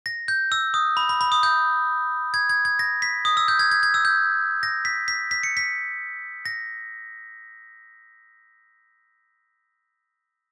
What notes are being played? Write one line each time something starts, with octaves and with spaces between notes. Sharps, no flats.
A#6
G6
E6
D#6
B5
B5
B5
D#6
G6
G#6
G#6
G#6
A#6
B6
D#6
E6
G6
G#6
G#6
G#6
E6
G6
A#6
B6
B6
B6
C#7
B6
A#6